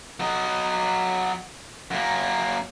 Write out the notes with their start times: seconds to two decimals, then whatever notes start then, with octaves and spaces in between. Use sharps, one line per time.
0.20 F#3 D#5
1.91 F#2 A#3